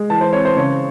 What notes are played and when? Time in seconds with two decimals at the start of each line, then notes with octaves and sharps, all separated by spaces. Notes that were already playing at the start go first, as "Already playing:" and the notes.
Already playing: G#3
0.10 E3 A5
0.21 C5
0.33 C4 C#5
0.45 C5
0.57 C#3 C#5